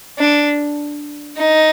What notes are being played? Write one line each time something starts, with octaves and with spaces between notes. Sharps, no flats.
D4
D#4